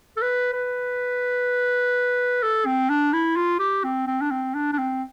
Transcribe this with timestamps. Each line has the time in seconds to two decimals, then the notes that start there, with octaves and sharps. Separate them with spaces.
0.17 A4
0.22 B4
0.53 B4
2.43 A4
2.66 C4
2.90 D4
3.13 E4
3.36 F4
3.59 G4
3.84 C4
4.07 C4
4.21 D4
4.31 C4
4.55 D4
4.73 D4
4.78 C4